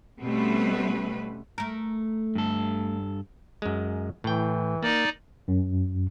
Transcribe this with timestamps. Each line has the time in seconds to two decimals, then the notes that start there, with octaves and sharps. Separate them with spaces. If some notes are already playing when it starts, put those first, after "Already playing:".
0.23 B2 G3 A3 C4 C#4 B4
1.58 A3 A#4
2.35 G2 A4
3.62 F#2 G#3
4.24 A2 E3 G5
4.83 A#3 D#4 D5
5.48 F#2